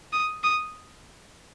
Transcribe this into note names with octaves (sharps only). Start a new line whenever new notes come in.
D#6
D#6